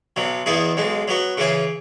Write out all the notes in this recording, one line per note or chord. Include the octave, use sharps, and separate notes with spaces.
B1 B2 F#3
E2 B2 B3 E4 G#4
B1 B2 G#3
F#3 B3 F#4
C#3 E3 C#4 G#4